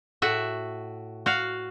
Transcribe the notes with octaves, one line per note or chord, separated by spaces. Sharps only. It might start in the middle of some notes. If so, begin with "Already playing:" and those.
A2 F#4 E5
F#4 F5